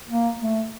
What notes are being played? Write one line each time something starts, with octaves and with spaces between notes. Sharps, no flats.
A#3
A3